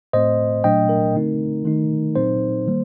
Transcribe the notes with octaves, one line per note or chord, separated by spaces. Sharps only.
A2 A3 C4 C5 D#5
A#2 F#3 A3 D4 D#5 G5
A#4
D3 A3 C4 D#4
D#3 A3 D#4
A#2 F#3 C4 D#4 C5
D#3 G3 A#3